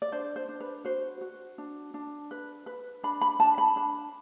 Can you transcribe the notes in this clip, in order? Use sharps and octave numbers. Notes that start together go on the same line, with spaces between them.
D5
D4 C5
C5
D4
B4
F#4 C5
F#4
D4
D4
B4
B4
D4 B5
B5
D4 A5
B5
D4 B5